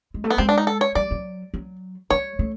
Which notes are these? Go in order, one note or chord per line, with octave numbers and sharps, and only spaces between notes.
G#3
A3
B3
G#3 C4
D4
D#4
A4
C#5
G3 D5
F#3
F#3
G3 C#5
A3